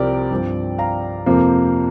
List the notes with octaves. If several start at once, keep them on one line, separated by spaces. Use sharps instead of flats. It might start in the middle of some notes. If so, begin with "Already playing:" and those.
Already playing: C2 C3 F3 C4 G4 A#4 D5 G5
G2 F3 C4
F5 A#5
F2 C3 F3 A#3